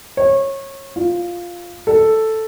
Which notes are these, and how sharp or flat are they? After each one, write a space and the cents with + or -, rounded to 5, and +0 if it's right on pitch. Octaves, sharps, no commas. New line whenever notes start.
C#5 -25
F4 +0
A4 +0